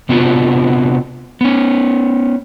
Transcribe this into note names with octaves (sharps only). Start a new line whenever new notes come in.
C3 B3 C4 D4 F4 F#4
B3 C#4